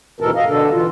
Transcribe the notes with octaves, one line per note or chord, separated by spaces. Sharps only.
D#2 G#2 B2 E3 A4 A#4
D#5 F5
B2 D3 D4 A4
E3 F4